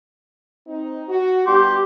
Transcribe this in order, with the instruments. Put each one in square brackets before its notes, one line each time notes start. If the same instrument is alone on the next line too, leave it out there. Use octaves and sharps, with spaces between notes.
[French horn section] C4 D#4
F#4
[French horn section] G3 B3 D4 [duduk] G4 [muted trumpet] C6